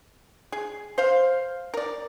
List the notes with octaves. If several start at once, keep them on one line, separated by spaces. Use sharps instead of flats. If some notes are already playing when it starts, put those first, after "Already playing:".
G#4
C5 F5
A#4 D5